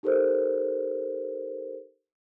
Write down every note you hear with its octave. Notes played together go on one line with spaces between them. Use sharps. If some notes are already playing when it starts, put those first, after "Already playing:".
D#4 G4 A4 A#4 C5